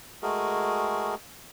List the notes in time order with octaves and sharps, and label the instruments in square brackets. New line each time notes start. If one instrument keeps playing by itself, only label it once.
[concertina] G#3 A3 F#4 G#4 A#4